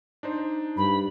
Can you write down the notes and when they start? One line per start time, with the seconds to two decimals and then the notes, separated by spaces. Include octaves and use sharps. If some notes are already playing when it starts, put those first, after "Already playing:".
0.23 D4 D#4 C5
0.77 G2 B5